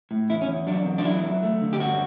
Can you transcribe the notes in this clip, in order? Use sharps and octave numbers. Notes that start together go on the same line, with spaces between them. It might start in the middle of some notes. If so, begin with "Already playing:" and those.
A2
E2 E4
C#4
E2
F#3 D4
E2
D4
F#3 E4
F#3
A3
D3
G4
G2 F#4